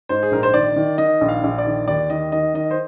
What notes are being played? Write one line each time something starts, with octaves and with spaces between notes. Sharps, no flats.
G#2 C5
G#4
A#1 A#4
C5
D#3 D5
D#3
D#3 D#5
A#1
F5
A#1
D5
D#3
D#2 D5
D#3 D#5
D#3 D#5
D#3 D#5
C5